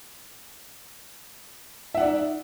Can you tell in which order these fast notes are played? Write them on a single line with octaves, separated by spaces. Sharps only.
E5 F#5 D5 D#4